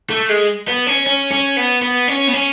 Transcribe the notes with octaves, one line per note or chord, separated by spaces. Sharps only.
A3
G#3
B3
C#4
C#4
C#4
B3
B3
C#4
B3
C#4